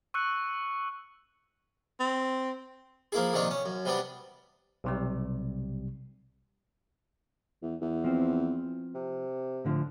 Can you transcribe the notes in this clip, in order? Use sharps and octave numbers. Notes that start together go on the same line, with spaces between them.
C#6 E6 F#6 C#7
C4
F3 A#3 E4 G#4
A#1 C3 D#3 D4 D#4
C#4
F#2
C3 G3 B3 D4
B1 C3 G3
E2
E2
F3 C4
C3
A2 D3 F3